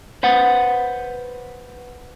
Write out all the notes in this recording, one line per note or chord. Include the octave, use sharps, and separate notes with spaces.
B4 C5 F#5